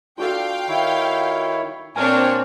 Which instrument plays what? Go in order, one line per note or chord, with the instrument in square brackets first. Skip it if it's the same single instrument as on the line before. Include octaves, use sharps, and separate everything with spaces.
[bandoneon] D4 [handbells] F4 F#4 A4 [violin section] F5 G5
[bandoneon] D#3 E4 C#5
[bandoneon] A#2 A#3 [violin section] C4 D4 C#5 [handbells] G#5 F6